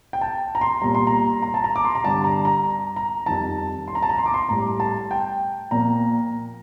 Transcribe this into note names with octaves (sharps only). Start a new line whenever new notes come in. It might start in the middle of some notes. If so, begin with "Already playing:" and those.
G5
A5
A#5
C6
A#2 G3 A#5
C6
A#5
A#5
A5
A#5
D6
C6
A#5
G2 D3 G3 A5
A#5
A#5
A#5
F2 D#3 G3 A5
C6
A#5
A5
A#5
C6
D6
C6
A2 G3 A#5
A5
G5
A#2 F3 A#5